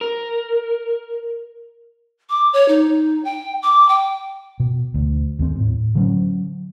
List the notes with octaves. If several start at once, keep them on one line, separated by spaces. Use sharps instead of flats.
A#4
D6
C#5
D#4
G5
D6
G5
B2
D2
D#2 G#3 C4
A2
D3 F#3 C#4